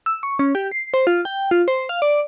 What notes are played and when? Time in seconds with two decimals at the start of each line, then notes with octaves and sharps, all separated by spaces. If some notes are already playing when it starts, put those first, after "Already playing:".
0.06 E6
0.23 C#6
0.39 C#4
0.55 G4
0.72 C7
0.94 C5
1.07 F4
1.25 G5
1.51 F4
1.68 C5
1.89 F5
2.02 D5